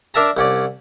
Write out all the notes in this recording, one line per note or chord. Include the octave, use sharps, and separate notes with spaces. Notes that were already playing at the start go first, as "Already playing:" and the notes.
D4 A#4 E5 A5 A#5
C2 C#4 D5